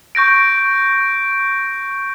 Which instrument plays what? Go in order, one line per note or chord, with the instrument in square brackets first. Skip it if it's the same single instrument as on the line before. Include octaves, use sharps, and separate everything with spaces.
[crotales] C#6 G6 A#6 D7